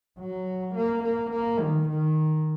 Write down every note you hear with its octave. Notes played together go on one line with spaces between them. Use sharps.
F#3
A#3
A#3
A#3
D#3
D#3